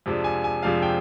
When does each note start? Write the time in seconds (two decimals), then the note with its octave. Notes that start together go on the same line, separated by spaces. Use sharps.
0.06 F2 C3 F3 G#3 D4
0.24 G#5
0.44 G#5
0.63 F2 C3 F3 G#3 D4 F5
0.82 G5